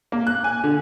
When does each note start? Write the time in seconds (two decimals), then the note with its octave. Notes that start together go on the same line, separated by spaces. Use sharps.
0.12 A#3
0.27 F#6
0.44 G#5
0.64 D3